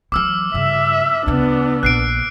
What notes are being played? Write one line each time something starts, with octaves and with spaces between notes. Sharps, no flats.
E3 F#3 D6 E6 F6
G2 C#3 E5
D2 C#3 B3 D4
A#1 A#2 F#6 C7 D7